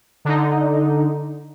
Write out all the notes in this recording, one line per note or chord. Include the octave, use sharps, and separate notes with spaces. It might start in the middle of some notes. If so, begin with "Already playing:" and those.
D3 D#4